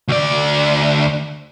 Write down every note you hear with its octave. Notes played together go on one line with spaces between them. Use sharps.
D2 D5